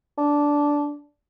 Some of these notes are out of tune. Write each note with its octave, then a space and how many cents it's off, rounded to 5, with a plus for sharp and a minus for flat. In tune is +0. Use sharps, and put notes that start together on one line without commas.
D4 -10